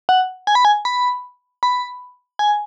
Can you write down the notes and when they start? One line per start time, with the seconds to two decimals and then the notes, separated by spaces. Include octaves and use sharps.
0.09 F#5
0.47 G#5
0.55 B5
0.65 G#5
0.85 B5
1.63 B5
2.39 G#5